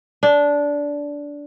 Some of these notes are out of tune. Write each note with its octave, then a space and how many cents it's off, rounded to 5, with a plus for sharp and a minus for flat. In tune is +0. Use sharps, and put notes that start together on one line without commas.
D4 -15